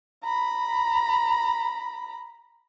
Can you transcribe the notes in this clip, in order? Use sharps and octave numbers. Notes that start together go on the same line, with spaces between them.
A#5 B5